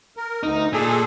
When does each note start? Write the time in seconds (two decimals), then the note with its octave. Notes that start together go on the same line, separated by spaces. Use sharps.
0.17 A#4
0.43 D2 D#4
0.73 A#2 G#4 A4